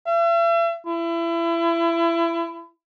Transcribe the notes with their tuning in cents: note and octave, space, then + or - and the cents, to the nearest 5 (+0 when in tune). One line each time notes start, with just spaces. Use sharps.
E5 +40
E4 +30